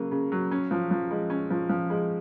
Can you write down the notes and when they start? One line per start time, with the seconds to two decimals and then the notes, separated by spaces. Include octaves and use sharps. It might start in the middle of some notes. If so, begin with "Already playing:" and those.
Already playing: C#3 F#3 A#3
0.11 C#3
0.32 F#3
0.51 C#4
0.71 F3
0.91 F3
1.11 G#3
1.30 C#4
1.50 F3
1.69 F3
1.90 G#3